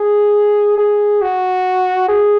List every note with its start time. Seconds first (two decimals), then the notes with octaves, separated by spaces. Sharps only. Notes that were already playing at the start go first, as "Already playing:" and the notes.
Already playing: G#4
0.78 G#4
1.22 F#4
2.08 G#4